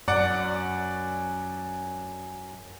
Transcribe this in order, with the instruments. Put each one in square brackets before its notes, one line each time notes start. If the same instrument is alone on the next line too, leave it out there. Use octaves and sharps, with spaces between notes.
[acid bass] F#2 [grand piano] D5 F#5